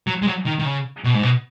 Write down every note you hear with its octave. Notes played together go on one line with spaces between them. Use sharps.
F#3
G#3
F#3
D#3
D#3
C#3
B2
G#2
B2